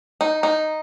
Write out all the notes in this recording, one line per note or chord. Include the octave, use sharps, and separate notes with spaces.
D#4
D#4